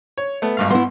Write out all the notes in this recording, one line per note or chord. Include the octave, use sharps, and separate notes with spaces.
C#5
A3 B3
G#1 G2 F5
B3 E4 C6